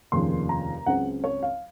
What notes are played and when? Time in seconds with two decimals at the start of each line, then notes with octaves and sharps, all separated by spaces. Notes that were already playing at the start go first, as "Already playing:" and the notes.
0.12 F1 D#2 C#3 F3 A#3 C6
0.49 A#5
0.86 C#2 C#3 F#3 C4 F#5
1.24 C#5
1.43 F5